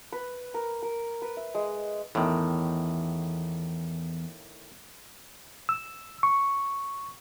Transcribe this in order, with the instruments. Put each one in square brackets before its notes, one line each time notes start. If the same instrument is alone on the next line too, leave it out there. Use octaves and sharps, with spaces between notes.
[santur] B4
A#4
A#4
B4
E5
G#3
[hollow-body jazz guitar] E2 [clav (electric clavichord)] A2 D#3
[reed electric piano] E6
C#6